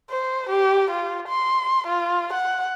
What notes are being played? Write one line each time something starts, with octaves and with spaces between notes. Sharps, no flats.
C5
G4
F4
C6
F4
F#5